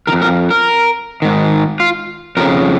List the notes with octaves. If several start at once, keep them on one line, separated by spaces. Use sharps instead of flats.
D#3 A#4
F2
A#4
A#4
G#2 D#3
F4
F2 C#3 A#4